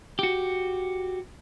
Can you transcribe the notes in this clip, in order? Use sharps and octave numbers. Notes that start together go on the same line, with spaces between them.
F#4 G4